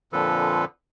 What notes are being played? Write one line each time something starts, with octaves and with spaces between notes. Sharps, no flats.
F2 A#2 D3 F3 A4 B4